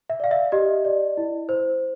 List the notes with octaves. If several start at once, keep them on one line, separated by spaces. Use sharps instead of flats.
E5
D5 F5
E5
G4 D#5
D5
E4
C5